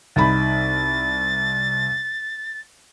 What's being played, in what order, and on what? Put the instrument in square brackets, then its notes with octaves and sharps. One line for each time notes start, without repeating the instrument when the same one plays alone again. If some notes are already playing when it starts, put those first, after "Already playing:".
[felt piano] C2 D#4 B5 [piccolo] A6